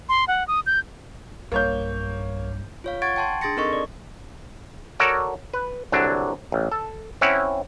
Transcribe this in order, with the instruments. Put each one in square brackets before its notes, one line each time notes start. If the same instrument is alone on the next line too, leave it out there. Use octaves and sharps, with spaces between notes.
[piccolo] C6
F#5
D#6
G6
[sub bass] B1 [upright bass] G2 [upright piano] A#3 C#5 G6
[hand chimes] F4 C#5 F5
F#5 C#6 G#6 A6 D7
G5 A5 C6
D4 G#4 C6 A6 A#6 C#7
C4 D#4 A4 A#4 D#5 C#6
D5
[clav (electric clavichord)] F#4 A4 A#4 C#5 D5
B4
C2 D3 F#3 D4
A1
A4
C4 C#4 E4 C#5 F#5